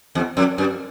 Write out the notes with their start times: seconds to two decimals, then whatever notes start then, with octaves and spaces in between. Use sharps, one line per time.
0.15 E2
0.37 F2
0.58 F#2